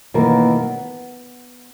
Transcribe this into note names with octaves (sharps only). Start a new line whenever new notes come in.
B2 D#3 E3 A#3 C#4 A#4
B3